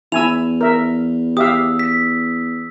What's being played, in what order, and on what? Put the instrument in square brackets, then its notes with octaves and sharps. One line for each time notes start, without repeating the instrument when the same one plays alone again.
[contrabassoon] E2 [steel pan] E4 G#5 E6 [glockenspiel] F7
[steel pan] A#4 E5
[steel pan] G4 E5 F5 [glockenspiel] D#6 E6
[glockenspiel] B6